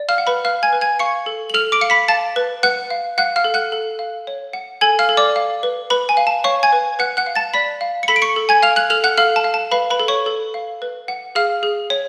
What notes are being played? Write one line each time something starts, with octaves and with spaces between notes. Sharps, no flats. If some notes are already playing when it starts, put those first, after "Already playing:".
Already playing: D5
F5 F6
F#5
B4 B5
B4 F5 F6
G#5 G#6
B4
G#5 G#6
F5 C#6 C#7
A4
F#7
A4 F6 F7
D6 D7
F5 C#7
B5 B6
F5 A5 A6
B4
B4 F#5 F#6
F5
F5 F#5 F#6
F5 F6
A4
F#5 F#6
A4
F5
C#5
F#5
A4 G#5 G#6
F5 F6
A4
D5 D6
F5
B4
B4 B5
G#5
F5
A5
C#5 F5 C#6
G#5 G#6
B4
B4 F#5 F#6
F#5 F#6
F5
A5 A6
D5 B5 B6
F5
C#7
A4 B5 B6
D7
C#6 C#7
A4
G#5 G#6
F5 F6 F7
F#6 F#7
A4 F6 F7
F#5 F#6
A4 F5 F6
A5
F5
A5
B4 F5 B5
B4 B5
A4
C#5 C#6
A4
F5
B4
F#5
G#4 F5 F6
G#4
C#5